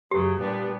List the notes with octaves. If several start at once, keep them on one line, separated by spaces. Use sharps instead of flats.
F#2 C#3 F#3 G4
A#2 G3 B3 D4